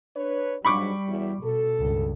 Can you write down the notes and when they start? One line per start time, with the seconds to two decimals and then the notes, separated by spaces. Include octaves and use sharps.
0.16 D4 B4 C#5
0.65 G#2 F#3 G3 D4 B5 C#6 D6
1.07 E2 F#3 E4
1.43 B2 A4
1.80 C#2 G2